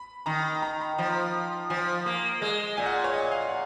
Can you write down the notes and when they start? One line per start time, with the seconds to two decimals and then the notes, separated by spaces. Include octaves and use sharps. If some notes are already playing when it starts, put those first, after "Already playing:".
Already playing: B5
0.26 D#3 A#5
0.62 A#5
0.81 B5
0.98 F3 A#5
1.70 F3 G#5
2.06 A#3
2.42 G#3
2.77 A#2 G#5
2.86 F#5
3.04 C#5
3.13 D#5
3.31 F5
3.49 F#5